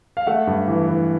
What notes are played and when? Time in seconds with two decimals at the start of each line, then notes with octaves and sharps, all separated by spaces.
0.17 F5
0.27 A3 E5 F#5
0.47 G2
0.68 E3
0.89 E3